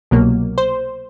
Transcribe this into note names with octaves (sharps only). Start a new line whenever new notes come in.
C2 B2 F#3 A#3
C5